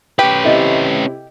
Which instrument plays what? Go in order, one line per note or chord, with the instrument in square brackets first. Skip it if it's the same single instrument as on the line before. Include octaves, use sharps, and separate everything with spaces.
[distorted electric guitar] C#4 B4 [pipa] G4
[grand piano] C3 E4 [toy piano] A4 D#5